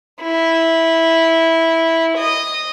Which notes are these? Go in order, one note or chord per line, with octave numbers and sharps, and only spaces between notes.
E4
D#5